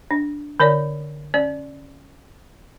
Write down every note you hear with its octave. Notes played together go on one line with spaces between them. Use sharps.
D4
D3 A#4 C#5 D5
C#4 D5